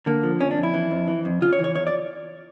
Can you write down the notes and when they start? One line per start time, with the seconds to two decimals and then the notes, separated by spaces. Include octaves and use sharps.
0.06 D3 A#3
0.23 F3
0.40 F2 C#4
0.51 D4
0.57 F2
0.63 E4
0.74 E3
0.91 F2
1.08 E3
1.25 F2
1.41 C#3 F4
1.53 C#5
1.59 E3
1.64 C#5
1.75 E2 C#5
1.87 D5